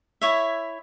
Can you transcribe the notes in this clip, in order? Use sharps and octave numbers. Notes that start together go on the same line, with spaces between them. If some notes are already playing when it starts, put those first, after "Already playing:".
E4 C#5 E5